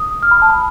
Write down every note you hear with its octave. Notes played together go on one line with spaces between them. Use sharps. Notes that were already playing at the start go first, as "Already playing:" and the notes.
Already playing: D#6
F6
B5
A5
B5